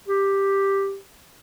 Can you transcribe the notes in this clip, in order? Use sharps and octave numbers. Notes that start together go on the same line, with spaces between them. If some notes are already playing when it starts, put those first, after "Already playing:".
G4